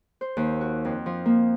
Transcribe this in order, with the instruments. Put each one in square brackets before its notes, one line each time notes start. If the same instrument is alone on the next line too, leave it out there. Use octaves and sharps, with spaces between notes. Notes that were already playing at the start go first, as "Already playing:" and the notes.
[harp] C5
D#2
F#4
F2
F3
A#3